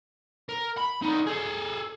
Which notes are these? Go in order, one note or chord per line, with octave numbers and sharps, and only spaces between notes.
A#4
B5
D3 D#4
G#4 A4